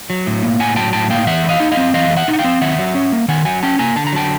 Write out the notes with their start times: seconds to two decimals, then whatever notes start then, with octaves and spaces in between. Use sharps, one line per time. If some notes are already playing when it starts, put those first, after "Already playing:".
0.10 F#3
0.26 A2
0.43 A#3
0.60 A2 F#5 G#5
0.76 F#3 G5 A5
0.93 A2 G5 A5
1.10 A#3 F5 G5
1.27 E3 E5 F#5
1.44 A3
1.49 D#5 F5
1.60 D#4
1.72 D#5 F5
1.77 C4
1.94 E3 D#5 F5
2.10 A3
2.17 E5 F#5
2.28 D#4
2.33 F#5
2.39 F5 G5
2.44 C4
2.61 D#3 E5 F#5
2.79 F#3
2.95 C#4
3.12 A#3
3.28 D#3 F#5 G#5
3.45 F#3 F#5 G#5
3.63 C#4 G5 A5
3.79 A#3 G#5 A#5
3.96 D3 A5
4.07 A#5
4.13 F#3 G5 A5